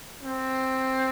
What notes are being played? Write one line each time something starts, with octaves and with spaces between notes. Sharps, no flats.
C4